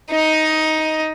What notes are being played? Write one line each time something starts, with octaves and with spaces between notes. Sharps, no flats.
D#4 D#5